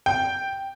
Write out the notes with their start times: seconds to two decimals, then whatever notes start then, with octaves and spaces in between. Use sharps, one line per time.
0.06 G5